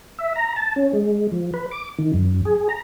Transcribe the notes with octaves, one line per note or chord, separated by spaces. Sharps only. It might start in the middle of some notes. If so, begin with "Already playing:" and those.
E5
A#5
A5
C#4
G#3
F3
B4
D6
D#3
F#2
G#4
A#5